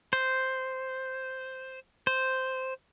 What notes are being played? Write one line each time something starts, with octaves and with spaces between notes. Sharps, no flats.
C5
C5